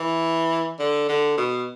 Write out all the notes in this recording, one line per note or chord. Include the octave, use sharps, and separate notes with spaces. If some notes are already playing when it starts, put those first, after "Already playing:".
Already playing: E3
D3
D3
B2